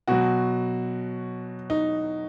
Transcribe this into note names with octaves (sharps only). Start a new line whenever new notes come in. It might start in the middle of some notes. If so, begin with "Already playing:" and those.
B2 F#3 F#4
D#4